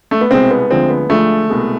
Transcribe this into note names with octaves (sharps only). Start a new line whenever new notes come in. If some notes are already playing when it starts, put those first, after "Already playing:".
A3
B3
C2 B2 G#3 C4
B3
D2 D3 F3 G#3 C4
B3
D2 D3 F3 G#3 A3
C2 B2 G#3